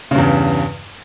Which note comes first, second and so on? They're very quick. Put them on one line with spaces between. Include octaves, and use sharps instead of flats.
C#3 G2 E2